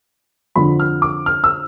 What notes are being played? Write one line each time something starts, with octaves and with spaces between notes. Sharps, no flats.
F2 D3 F3 B5
F6
D6
F6
E6